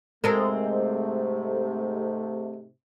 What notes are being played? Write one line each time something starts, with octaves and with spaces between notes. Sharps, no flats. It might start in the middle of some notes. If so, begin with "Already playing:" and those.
G#2 C3 G#3 A3 C4 A4 A#4